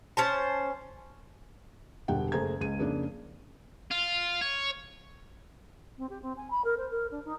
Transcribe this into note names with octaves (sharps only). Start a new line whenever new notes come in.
C#4 C5 A5
E1 D3 G3 F#5 G5
F#1 A3 G#4 C5 A#5 G#6
C#2 G#3 D#7
F2 C#3 A#3 D4
F4
C#5
C4
G4
C4
G#5
B5
A#4
C5
A#4
D4
D#4